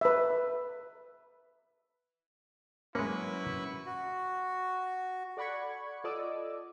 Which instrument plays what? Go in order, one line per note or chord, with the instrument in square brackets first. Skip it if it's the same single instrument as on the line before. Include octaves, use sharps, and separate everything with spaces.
[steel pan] B4 E5
[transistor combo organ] F#3 B4 C#6 [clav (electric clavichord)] G#3 A#3 [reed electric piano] C#4 [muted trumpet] E4
[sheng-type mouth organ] F#4
[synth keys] A4 D5 F#5 B5 C#6 G#6
F4 A4 D5 D#5 D6 E6